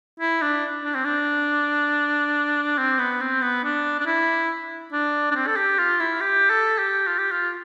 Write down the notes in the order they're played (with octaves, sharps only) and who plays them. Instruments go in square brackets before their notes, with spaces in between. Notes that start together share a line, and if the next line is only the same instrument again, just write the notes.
[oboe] E4
D4
D4
C4
D4
C4
B3
C4
B3
D4
D4
E4
D4
D4
C4
A4
G4
F4
E4
G4
A4
G4
F4
G4
F4